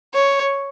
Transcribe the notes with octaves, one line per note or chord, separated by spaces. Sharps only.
C#5